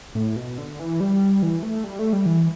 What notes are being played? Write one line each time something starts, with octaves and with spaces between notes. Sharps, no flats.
A2
B2
D3
E3
G3
E3
A3
G3
A3
G3
E3